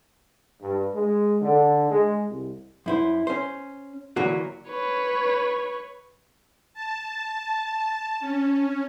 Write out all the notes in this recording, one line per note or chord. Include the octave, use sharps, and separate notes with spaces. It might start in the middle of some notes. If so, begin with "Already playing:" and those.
G2
G#3
D3
G#3
C2
F#2 E4 C5
C#4 C5
D3 E3 F#3 A#3 F#4
B4 C#5
A5
C#4